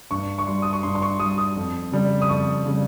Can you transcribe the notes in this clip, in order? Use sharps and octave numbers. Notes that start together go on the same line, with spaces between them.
G2 C#6
C#6
G3 C6
D#6
C#6
G2 C6
C6
C#6
G3 D#6
D#6
F2
C#3 G3
D#6
F2 C#6
C#3 G3